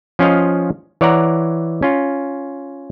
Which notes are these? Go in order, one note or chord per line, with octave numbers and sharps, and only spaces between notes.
F3 C#4 F4 D#5 F5
E3 C#5 D5 F#5 A#5
C#4 F4